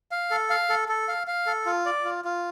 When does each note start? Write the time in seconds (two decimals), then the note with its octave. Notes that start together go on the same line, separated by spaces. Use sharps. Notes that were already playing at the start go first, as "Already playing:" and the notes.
0.11 F5
0.31 A4
0.50 F5
0.69 A4
0.88 A4
1.08 F5
1.27 F5
1.46 A4
1.66 F4
1.86 D5
2.05 F4
2.25 F4